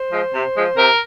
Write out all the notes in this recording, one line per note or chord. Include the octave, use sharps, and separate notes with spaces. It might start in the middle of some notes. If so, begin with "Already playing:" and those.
Already playing: C5
F3 G#3
C3
F3 G#3
C3 A#4